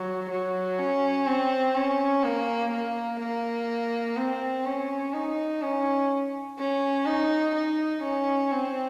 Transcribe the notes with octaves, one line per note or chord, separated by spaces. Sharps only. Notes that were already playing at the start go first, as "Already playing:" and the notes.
Already playing: F#3
F#3
C#4
C4
C#4
A#3
A#3
A#3
C4
C#4
D#4
C#4
C#4
D#4
D#4
C#4
C4